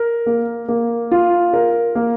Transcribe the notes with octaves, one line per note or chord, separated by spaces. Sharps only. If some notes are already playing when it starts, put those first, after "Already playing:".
Already playing: A#4
A#3
A#3
F4
A#4
A#3